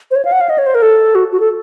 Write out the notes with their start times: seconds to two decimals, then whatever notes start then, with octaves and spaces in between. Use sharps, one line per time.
0.11 C5
0.16 C#5
0.25 F5
0.32 F#5
0.41 F5
0.50 D#5
0.58 C#5
0.66 C5
0.75 A#4
0.82 A4
1.15 F#4
1.32 F#4
1.40 A4